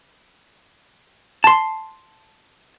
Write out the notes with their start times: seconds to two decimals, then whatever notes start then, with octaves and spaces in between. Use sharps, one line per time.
1.44 A5 C6